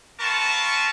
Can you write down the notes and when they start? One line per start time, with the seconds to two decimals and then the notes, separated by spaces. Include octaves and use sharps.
0.20 C4 F4 A#4 B4 A5 C#6